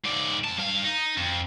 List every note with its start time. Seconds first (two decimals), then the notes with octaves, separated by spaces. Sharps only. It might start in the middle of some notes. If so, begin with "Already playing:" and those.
0.05 G#2 D5
0.44 F2 A5
0.58 G2 F5
0.84 D#4
1.17 F2